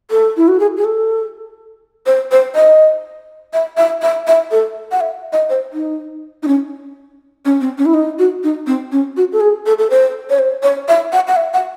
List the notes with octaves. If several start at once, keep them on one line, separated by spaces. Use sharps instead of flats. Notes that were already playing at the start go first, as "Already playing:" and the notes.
A4
E4
F#4
G#4
G#4
A4
C5
C5
D#5
E5
E5
E5
E5
A4
F#5
E5
D#5
C5
D#4
D#4
C#4
C#4
C4
C#4
E4
D#4
F#4
D#4
C4
C#4
F#4
A4
G#4
A4
A4
C5
C#5
C5
C#5
E5
F#5
F#5
E5
F#5